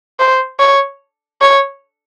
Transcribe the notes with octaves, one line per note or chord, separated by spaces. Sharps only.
C5
C#5
C#5